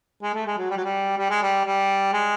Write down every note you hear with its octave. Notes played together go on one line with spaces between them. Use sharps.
G#3
A3
G#3
F#3
G3
F#3
G3
G3
G#3
G3
G3
G#3